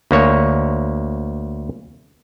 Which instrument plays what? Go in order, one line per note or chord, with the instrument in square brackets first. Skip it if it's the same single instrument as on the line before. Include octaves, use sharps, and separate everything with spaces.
[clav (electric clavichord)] D2 A#3 C#5